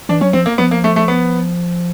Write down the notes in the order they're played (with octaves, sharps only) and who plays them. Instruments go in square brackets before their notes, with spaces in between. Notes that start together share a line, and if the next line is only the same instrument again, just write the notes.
[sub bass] E3 [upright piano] D4
[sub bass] F#3 [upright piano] C#4
[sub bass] F3 [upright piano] C4
[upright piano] A#3
[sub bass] F3 [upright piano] B3
[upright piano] A#3
A3
A3
B3